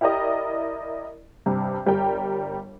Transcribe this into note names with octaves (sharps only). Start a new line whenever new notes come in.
E4 G4 A#4 D5 D#5
G2 C3
G1 G3 G4 A#4 G5